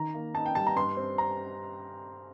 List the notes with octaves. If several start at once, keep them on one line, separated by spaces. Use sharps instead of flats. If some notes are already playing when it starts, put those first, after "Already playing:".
Already playing: D#3 A#5
A#3
D#4 A5
G5
G3 A5
A#5
G2 C6
C4
A#5